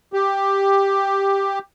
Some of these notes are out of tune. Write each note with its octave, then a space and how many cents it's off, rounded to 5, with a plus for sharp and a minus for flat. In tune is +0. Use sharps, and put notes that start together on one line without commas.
G4 +5